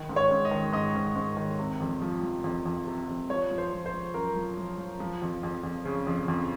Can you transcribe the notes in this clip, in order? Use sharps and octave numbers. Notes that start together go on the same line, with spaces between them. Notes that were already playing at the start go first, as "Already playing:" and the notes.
Already playing: D#3
G#2
C#5
G#2
D#5
D#3
G#2 D#5
G#2
G#2
D#3
C3
F2
F3
F3
F2
F2
C3
F2
F3 C#5
F3
C5
F3
C5
F3
F#2 A#4
F3
F3
F3
F3
F2
F2
F2
C#3
F2
F2